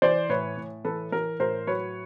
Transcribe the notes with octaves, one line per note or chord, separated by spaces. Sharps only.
E3 C5 D5
A2 B4 C#5
A2
E3 A4 B4
E3 A#4
A2 A#4 C5
F#3 B4 C#5